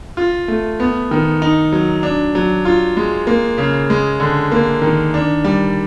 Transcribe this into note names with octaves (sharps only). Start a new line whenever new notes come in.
F4
A3
B3
D#3
D#4
F#3
D4
F#3
F4
G#3
A#3
C#3
G#3
D3
A#3
D#3
D4
G3